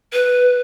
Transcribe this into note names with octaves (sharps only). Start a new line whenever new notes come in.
B4